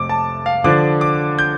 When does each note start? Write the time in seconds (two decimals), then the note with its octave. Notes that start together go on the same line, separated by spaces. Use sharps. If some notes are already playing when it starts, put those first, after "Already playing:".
Already playing: F2 C3 A3 D6
0.09 A5
0.46 F5
0.64 D3 F3 D4 D6
1.01 D6
1.39 G6